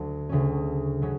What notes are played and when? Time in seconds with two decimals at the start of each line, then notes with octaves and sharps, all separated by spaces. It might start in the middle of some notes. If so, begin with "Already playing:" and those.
Already playing: D2 D3 F#3
0.29 D2 C#3 F#3 C#4
1.02 C#3 F#3 C#4 F#4